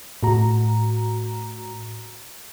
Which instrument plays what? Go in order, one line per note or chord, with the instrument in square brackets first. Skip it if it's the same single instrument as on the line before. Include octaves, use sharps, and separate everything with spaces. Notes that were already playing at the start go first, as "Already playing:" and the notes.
[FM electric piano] A2 F#4 A#5